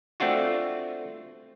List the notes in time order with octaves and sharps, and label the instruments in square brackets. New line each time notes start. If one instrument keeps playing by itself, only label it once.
[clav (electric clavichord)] A3 C4 D4 F4 F#4